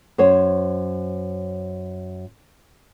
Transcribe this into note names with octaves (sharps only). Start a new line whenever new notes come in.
F#2 C5 C#5